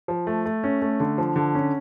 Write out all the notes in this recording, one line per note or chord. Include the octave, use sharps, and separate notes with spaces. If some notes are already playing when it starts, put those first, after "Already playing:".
F3
A3
A3
C#4
A3
D3
F3
D3
C#4